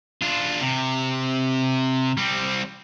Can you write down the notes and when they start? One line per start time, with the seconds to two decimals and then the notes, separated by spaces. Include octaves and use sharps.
0.22 D4 F4
0.61 C3
2.17 G3 C4